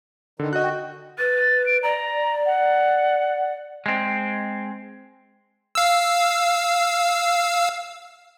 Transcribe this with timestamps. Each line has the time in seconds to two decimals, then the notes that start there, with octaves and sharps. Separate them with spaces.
0.39 D3 D#3
0.53 F#4 D#5 F#6
0.64 G5
1.18 B4 A6
1.66 D7
1.83 D5 A#5
2.46 F#5
3.86 G#3 C4
5.75 F5 E6